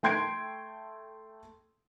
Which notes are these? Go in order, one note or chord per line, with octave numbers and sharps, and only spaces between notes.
A3 G5 C6 G#6 C7 D7